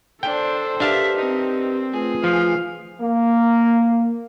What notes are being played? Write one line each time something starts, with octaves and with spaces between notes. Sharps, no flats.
D4 A4 C5 G5
D4 G4 A#4 B4 E5 F5 A5
C4 D#4
A3 F4 G#4 B4
F3 F5
A#3